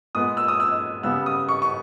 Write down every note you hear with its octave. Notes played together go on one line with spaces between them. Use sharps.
A#2 G#3 B3 D#6
E6
D#6
E6
C#3 G3 B3 E6
D#6
C#6
C#6